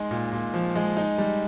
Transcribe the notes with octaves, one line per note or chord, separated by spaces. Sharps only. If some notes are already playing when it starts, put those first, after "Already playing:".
Already playing: G#3 D#4 C6
A#2
A#2
F3
G#3
D#4
G3